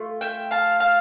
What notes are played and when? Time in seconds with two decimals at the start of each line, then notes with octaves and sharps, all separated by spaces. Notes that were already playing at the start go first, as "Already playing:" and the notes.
Already playing: A3 F4
0.21 E5 G5
0.51 F5 A5
0.80 F5 A5